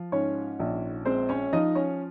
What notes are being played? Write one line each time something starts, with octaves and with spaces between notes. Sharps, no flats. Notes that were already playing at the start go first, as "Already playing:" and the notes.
Already playing: F3
G#2 C#4 C#5
A#1
G#3 C4 C5
C#4 C#5
F3 D#4 D#5
C#4 C#5